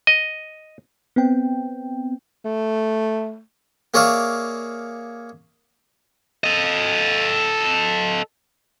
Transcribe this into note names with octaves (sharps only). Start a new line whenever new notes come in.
D#5
B3 C4 G5
A3
A#3 G#4 C#5 D5 E5 F5
A4 D#5